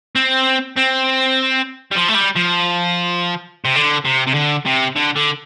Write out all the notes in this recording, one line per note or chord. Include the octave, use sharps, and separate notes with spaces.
C4
C4
G3
F3
A3
G3
F3
C3
D3
C3
C3
D3
C3
D3
D3